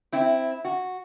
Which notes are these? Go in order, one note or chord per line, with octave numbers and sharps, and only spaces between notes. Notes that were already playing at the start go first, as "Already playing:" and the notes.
C4 E4
F#4